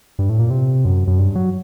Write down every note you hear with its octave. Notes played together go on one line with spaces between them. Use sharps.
G2
A2
A#2
C3
F#2
F#2
G2
F#3